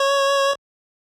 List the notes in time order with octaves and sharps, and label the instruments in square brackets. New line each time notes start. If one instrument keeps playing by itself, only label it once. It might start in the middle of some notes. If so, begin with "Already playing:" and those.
Already playing: [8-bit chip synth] C#5